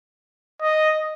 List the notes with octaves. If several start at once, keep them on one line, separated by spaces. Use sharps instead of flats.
D#5